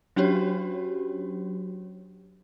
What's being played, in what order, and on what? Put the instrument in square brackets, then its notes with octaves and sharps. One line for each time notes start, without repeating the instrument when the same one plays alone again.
[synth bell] F#3 C#4 D4 F#4 G4 C#5